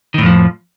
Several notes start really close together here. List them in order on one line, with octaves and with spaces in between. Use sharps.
D#3 A2 F2 F3